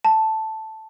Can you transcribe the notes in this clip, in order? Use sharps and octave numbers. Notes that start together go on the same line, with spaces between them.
A5